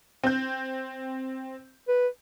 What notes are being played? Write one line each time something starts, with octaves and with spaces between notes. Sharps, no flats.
C4 G6
B4